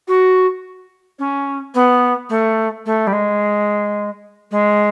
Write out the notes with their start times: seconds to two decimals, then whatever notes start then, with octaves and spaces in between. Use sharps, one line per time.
0.07 F#4
1.19 C#4
1.74 B3
2.29 A3
2.85 A3
3.07 G3
3.12 G#3
4.51 G#3